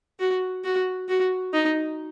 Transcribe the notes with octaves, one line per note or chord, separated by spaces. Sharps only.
F#4
F#4
F#4
D#4